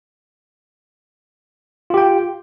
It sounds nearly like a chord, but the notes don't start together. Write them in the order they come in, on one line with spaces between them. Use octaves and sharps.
F4 G4 G5